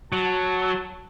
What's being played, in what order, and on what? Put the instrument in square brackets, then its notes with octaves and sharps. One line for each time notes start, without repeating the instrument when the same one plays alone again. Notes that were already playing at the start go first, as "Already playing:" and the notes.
[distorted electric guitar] F#3 [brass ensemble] F#4 A5